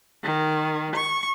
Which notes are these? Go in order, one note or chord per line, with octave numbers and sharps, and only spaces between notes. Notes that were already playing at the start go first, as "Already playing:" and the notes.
D#3
C#6